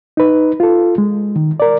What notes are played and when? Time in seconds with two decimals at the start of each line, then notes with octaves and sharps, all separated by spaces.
0.17 D#4 B4
0.60 F4 A4
0.98 G#3
1.36 D#3
1.60 A#4 D5